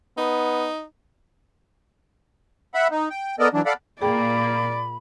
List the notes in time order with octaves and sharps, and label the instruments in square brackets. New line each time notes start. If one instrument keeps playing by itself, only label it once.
[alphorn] B3 [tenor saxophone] D#4
[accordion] E5 F#5 B5
D#4
G5
B3 A4 A#4 D5 D#5
E3 F#3 D4
A4 D5 F5 F#5 B5
[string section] A#2 A#3 [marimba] G#4 G5 [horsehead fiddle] D5 [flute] B5